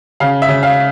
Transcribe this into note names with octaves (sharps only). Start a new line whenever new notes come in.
C#3 F5
E5
C#3
F5